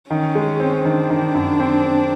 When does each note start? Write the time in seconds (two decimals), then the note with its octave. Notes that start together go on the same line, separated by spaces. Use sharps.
0.10 D#3 C#4
0.35 G#3
0.60 C4
0.85 D#3 D4
1.10 D#3
1.34 F#2
1.60 C4
1.85 C4